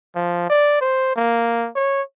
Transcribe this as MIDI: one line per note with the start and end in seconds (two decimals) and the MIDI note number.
0.16 0.47 53
0.50 0.76 74
0.81 1.15 72
1.16 1.69 58
1.76 2.02 73